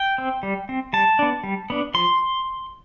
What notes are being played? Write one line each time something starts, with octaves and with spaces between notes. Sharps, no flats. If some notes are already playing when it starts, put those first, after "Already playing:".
Already playing: G5
C4
G3
C4
G3 A5
B3 D4
G3
B3 D4
F3 C6